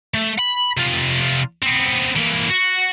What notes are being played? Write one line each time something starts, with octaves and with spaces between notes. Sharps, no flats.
A3
B5
C3 F4
B3 C4
E3 A#3
F#4